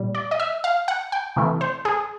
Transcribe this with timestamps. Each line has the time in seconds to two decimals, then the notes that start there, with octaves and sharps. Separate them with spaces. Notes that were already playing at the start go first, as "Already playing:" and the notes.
Already playing: A#2 G3
0.15 D5
0.31 D#5
0.40 E5
0.64 F5
0.88 F#5
1.12 G5
1.36 C3 E3 A3
1.61 C5
1.85 G#4